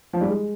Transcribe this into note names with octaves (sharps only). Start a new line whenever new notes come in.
F3
G3
G#3